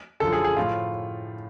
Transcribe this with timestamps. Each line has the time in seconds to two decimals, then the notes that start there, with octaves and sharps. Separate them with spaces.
0.20 F#2 D3 F3 A4
0.33 G#4
0.44 G#4
0.57 A2 F3 F4